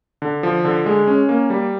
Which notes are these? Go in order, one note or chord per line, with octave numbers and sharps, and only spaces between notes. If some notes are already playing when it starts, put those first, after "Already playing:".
D3
F3
D3
G#3
C#4
A#3
G3